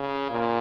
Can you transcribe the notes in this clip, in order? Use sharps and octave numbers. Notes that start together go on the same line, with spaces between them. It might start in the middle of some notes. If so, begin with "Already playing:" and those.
Already playing: C#3
A#2